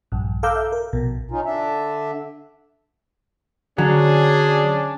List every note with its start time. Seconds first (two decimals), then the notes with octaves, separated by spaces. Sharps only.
0.12 A#1 G2
0.43 A4 F5 A#5 D6 E6 G6
0.56 E5
0.72 A#4
0.93 A#1 B2
1.31 C#4 D#4 F4
1.46 D3 D4 E5
3.78 D3 F#3 C#4 D4 G#4 D5